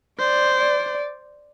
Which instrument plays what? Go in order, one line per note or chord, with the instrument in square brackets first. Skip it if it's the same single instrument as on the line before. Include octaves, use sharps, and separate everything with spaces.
[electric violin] C5 [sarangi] D5
[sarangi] D5